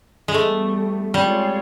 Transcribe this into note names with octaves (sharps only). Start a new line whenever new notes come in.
G#3
E3 G3 A3 B3
G3 G#3 C4 F4 G#4 C#5